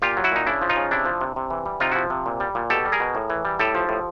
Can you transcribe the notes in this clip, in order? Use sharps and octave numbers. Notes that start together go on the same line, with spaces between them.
A#2 F4 G4
F#3
E4 F#4
A#2 D#4
C#3 D4 E4
F3
D#4 F4
C#3
C3 D4 E4
F3
C3
C3
E3
G3
C3 D#4 F4
F3 E4 F#4
C3
A#2
G3
A#2
B2 G4 A4
G3
G#4 A#4
B2
A2
E3
G3
A2 G4 A4
F3
A2